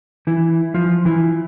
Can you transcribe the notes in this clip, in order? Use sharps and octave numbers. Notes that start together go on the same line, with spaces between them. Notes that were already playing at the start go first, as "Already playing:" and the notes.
E3 E4
F3 F4
E3 E4